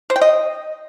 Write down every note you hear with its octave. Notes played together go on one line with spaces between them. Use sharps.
C5
G5
D#5